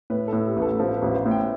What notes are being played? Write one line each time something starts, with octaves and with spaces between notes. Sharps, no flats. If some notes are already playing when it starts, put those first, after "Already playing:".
A2 B4
A2 A4
G4
A1 B4
A4
F3 A4
B4
A1
C5
A2
G5